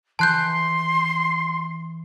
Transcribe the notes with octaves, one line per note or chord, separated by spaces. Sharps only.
E3 A5 C6 F#6 G6